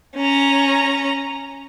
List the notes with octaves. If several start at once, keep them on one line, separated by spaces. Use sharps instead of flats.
C#4 A#5